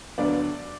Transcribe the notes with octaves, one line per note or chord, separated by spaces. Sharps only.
D2 D3 F#3 B3 D5